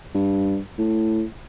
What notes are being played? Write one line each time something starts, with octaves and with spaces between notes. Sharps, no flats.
G2
A2